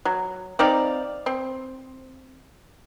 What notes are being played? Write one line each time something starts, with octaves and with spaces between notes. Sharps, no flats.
F#3
C4 D#4 D5 F5
C4